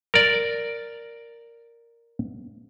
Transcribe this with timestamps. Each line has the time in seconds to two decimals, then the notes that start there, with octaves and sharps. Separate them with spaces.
0.14 A#4 D5